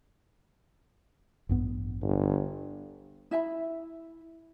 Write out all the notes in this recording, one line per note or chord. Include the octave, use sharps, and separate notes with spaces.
A1 G2 B3
G1
E4 E5 G#5 B5